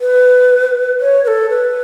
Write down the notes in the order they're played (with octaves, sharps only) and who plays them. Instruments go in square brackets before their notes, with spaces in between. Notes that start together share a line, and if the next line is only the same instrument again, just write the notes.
[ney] B4
C#5
B4
A4
B4